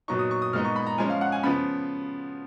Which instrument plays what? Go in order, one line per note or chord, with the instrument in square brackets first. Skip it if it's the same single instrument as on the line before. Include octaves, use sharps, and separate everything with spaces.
[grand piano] A#2 F#3 B3 D#4 C#6
D#6
C#6
D#6
A#2 G#3 B3 D#4 F6
C#6
B5
A#5
F3 G#3 C#4 G#5
F5
F#5
G#5
C#3 F3 B3 B5